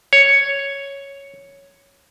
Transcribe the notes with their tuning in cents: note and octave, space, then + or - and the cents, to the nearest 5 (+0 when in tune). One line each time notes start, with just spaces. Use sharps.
C#5 +0